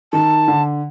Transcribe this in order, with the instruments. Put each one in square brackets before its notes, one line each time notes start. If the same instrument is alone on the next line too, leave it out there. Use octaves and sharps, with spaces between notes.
[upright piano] D#3 [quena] A5
[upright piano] D3